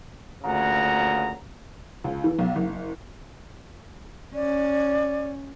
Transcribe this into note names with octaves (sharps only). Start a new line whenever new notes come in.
D2 A#2 C#3 F#5 A#5
C#2
E3
B1
F#1
C#4 D5